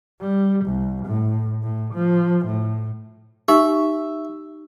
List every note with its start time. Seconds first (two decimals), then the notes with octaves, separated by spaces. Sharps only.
0.20 G3
0.65 C2
1.06 A2
1.63 A2
1.94 F3
2.46 A2
3.48 D#4 G4 E5 C#6